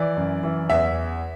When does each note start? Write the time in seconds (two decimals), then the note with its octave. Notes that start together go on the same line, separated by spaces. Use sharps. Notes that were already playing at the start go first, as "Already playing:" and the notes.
Already playing: E3 D5
0.17 F#2
0.43 E3
0.70 E2 E5